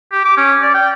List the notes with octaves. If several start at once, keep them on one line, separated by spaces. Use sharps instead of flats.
G4
D6
C#4
D5
G5